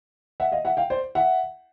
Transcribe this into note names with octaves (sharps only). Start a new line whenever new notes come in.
E5 F#5
D#5 F5
E5 F#5
F5 G5
C5 D5
E5 F#5